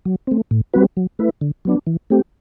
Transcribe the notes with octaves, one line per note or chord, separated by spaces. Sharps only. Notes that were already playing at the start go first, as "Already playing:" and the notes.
F#3
A3 C4
A2
G3 C4 F#4 B4
F#3
A3 E4 B4
D3
F#3 B3 D4
E3
A3 C4 G4